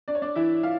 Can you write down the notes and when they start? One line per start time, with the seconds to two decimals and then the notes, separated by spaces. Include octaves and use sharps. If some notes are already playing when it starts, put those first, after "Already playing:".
0.08 D4 D5
0.15 C#5
0.22 D4 D5
0.35 E3 E4 E5
0.63 E3 F4 F5